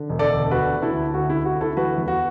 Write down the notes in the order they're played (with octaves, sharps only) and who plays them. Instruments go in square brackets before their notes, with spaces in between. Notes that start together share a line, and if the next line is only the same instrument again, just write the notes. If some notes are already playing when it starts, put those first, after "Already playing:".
Already playing: [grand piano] D3
E1
A4 D5
D2
D2 F#4 B4
D2
E4 A4
D2
D2 F#4
D2 E4
F#4
D2
E4 A4
E3 F#4 B4
E2
F#4